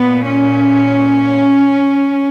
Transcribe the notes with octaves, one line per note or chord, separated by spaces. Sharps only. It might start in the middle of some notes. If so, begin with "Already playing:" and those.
Already playing: A#2 B3
C#4